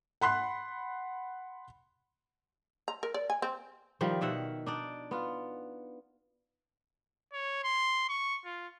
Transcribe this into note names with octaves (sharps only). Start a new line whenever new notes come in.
F#5 B5 C6 F#6
A#5
A#4
D5
G#5
C4
D#3 F3 G3
B2 D#3 E5 F#5
D4 D#4 D5
B3 F4
C#5
C6
C#6
F4